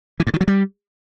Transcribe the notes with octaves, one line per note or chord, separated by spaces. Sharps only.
E3
G2
D#3
F#3
G3